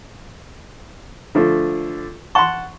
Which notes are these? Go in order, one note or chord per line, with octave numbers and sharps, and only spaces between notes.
D3 F3 A3
F#5 A5 C6 C#6